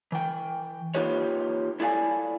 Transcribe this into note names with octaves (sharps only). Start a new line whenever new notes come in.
E3 G5
A#3 D#4 F4 G4 B4 C#5
E4 A4 D5 F5 G#5